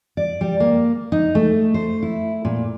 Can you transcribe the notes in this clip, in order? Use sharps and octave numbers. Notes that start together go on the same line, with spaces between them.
D5
G3
A#3
D#4
A3
C5
E4
A#2